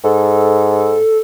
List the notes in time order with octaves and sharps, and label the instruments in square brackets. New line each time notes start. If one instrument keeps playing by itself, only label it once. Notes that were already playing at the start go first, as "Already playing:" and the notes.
[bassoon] G#2 [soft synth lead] A4